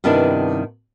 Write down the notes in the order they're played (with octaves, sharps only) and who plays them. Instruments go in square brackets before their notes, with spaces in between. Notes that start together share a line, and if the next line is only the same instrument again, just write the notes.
[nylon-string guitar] G2 C3 D#3 B3 D4 E4